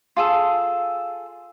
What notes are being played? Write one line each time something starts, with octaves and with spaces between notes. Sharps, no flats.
F4 G#4 A4